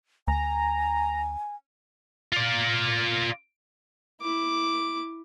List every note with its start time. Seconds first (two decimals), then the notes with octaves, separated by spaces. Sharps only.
0.28 D2 G#5 A#5
2.33 F4 D5
4.21 E4 D6